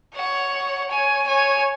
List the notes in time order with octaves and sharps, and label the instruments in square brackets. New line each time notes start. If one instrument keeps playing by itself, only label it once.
[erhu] C#5 [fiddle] F#5
[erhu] C#5 [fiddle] G#5
[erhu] C#5 [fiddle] G#5